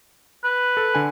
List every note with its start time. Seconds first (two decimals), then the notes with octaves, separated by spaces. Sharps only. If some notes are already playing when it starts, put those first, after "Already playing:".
0.44 B4
0.77 A4
0.95 D3 G#5